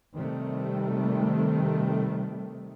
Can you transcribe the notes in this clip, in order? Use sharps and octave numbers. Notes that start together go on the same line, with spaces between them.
C3 D#3 G3 A3